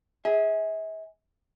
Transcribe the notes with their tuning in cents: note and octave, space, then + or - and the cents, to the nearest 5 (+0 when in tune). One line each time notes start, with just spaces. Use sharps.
G#4 +0 E5 -40